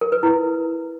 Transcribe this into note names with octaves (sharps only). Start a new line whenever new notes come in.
A#4
B4
E4